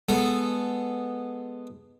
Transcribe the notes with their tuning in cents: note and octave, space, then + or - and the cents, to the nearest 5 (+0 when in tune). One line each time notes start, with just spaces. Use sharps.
G#3 +0 B3 +0 A4 +0